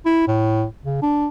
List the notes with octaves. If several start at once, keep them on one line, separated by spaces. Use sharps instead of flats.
E4
A2
C#3
D4